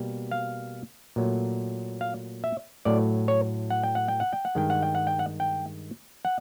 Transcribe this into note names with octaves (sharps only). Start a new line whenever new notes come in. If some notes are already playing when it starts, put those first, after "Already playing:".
Already playing: B2 G3 A#3
F5
A#2 F#3 A3
F5
E5
A2 F#3 A3 D5
C#5
F#5
G5
F#5
G5
F#5
G5
F#5
G2 D#3 G#3 G5
F#5
G5
F#5
G5
F#5
G5
F#5